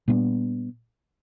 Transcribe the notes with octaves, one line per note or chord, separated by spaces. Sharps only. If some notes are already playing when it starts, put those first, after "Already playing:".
A#2 G3 B3 D4